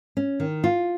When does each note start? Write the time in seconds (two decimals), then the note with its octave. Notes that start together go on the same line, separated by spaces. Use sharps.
0.17 C#4
0.40 D#3
0.64 F4